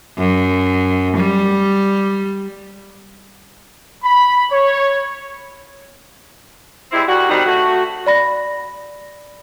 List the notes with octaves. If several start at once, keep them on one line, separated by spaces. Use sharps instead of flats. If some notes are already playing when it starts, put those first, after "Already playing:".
F#2
G3
B5
C#5
G3 G#3 C4 E4
D2 G3 F#4
C3 D#3 G3 D#4 F#4
A3 F#4
D5 B5 A#6